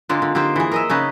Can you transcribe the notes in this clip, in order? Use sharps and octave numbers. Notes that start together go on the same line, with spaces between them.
D3 G#3 A#3 F4
D3
D3 D#4 G4 C5
E3 G#4
A#4 D#5 E5
C#3 C#4 D#4 B4